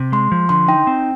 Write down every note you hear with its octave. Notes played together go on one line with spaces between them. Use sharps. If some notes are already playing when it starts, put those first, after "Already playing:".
Already playing: C3
G#3 C6
F3
D3 C6
D#4 G5
C4